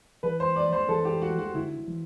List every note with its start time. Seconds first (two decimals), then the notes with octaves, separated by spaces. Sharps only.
0.23 E3 B4
0.40 C5
0.56 D5
0.73 C5
0.88 E3 A4
1.05 G4
1.22 F#4
1.39 F#4
1.54 D3 E4
1.88 E3